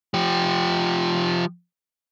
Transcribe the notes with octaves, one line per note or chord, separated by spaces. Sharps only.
F3 G4